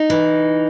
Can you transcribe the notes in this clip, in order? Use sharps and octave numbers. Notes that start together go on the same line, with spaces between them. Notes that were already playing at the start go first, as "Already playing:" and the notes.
Already playing: D#4
E3